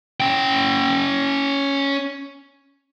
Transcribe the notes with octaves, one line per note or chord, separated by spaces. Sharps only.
C#4 G5